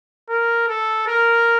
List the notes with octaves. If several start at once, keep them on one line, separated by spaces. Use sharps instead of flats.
A#4
A4
A#4